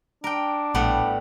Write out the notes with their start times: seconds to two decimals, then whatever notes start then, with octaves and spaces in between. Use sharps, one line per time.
0.24 D4 A#4 G5
0.75 A#1 A2 G3 B3